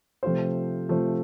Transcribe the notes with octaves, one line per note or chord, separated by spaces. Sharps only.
C3 F3 A3 F4 C5
C3 F3 A3 F4 C5